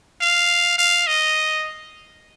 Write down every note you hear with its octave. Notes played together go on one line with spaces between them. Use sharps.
F5
F5
D#5